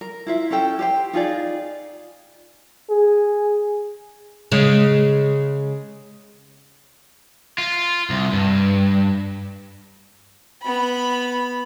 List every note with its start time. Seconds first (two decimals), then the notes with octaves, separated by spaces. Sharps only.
0.01 A#4
0.27 E4 F4 E5
0.51 C#4 E4 A4 G5
0.79 G4 C5 G5
1.13 D#4 F4 G#4 D5
2.90 G#4
4.52 C#3 G#3
7.58 F4
8.10 C2
8.33 G2
10.62 B3 B5